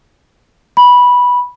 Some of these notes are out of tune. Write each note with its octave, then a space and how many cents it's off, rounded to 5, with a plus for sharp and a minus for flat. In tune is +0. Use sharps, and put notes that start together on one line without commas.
B5 -10